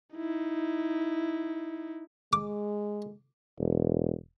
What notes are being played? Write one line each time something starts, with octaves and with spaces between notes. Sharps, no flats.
D#4 E4
G#3 D6
E1